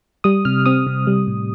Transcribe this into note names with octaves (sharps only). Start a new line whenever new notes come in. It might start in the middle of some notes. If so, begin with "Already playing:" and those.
G3 D#6
C3 F6
C4 D#6
C3
G3
A2